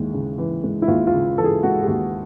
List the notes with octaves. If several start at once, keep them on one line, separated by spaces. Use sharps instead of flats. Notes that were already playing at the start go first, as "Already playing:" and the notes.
Already playing: D#2 E3 G#3
C#3
E3
G#3
E4
D#2 F4
F4
C#3
E3 A4
G#4
G#3 F#4
G4
D#2 F#4